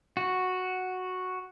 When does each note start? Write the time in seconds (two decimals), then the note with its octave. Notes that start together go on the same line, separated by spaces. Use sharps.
0.17 F#4